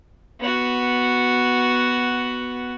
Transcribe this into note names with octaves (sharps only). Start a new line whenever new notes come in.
B3 F#4